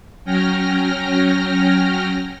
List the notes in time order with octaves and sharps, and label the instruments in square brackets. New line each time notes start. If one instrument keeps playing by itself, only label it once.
[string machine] F#3 C#4 G5 F6 A#6